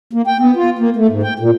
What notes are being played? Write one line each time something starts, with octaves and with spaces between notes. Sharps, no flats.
A#3
G5
B3
F4
A#3
A3
G#2
G5
A#2